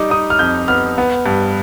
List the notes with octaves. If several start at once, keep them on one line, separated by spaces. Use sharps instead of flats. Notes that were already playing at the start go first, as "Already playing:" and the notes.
Already playing: G3 D#4 D6
D#4 D#6
F6
F2 G6
B3 F6
B3
G2